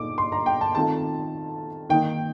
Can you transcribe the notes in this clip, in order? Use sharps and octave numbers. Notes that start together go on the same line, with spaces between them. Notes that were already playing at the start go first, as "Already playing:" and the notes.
Already playing: A#2 A3 D#4 D6
C6
A#5
G5
A5
D#3 A3 C4 F4 A5
D#3 A#3 D#4 G5